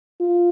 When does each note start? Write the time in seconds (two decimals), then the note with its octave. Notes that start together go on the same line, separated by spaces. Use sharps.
0.21 F4